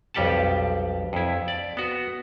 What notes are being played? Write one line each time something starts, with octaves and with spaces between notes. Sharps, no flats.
B1 F2 G3 G4 F#5 A5
F2 E4
D5
B3 F#4